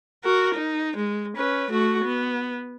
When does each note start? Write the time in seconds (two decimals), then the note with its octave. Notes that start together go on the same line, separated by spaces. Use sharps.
0.24 F#4 A#4
0.54 D#4
0.96 G#3
1.37 C#4 B4
1.71 A3 F#4
2.04 B3